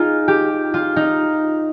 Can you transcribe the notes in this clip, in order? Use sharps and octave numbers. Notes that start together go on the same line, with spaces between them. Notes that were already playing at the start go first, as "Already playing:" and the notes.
Already playing: D#4 F4 G#4
G4
F4
D#4